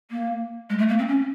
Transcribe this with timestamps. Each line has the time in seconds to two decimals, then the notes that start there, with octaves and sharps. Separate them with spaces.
0.11 A#3
0.70 G#3
0.78 A3
0.89 A#3
0.98 C4
1.08 C#4